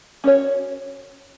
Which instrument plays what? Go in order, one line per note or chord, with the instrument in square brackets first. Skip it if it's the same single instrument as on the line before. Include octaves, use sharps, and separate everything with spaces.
[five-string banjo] C#4 F#4 C#5